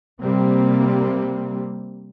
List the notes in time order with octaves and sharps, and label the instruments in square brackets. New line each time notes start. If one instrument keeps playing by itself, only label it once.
[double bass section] C3 G3 A#3 C4